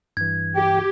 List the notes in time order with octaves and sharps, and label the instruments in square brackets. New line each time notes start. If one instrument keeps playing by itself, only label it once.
[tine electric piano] G2 E3 [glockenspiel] G#6
[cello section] G4 [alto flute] G5